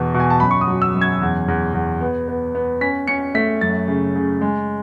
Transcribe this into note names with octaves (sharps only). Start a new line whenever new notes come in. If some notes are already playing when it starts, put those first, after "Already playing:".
Already playing: E2 B2 B3
B2
G#5
A5
F#2 B5
C#6
D#6
F#3
E6
F#2
G#6
E2
E2
E2
B3
B3
B3
C#4 B6
C#4 C#7
A3 B6
F#2 A6
C#3
C#3
G#3